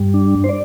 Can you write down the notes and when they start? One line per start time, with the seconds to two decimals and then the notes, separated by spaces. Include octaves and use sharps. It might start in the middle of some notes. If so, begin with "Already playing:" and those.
Already playing: G2 G3
0.14 D4
0.44 C5
0.49 D5